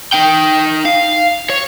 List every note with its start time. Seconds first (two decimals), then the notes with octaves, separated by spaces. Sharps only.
0.13 D#4 G5
0.86 F5
1.50 C#5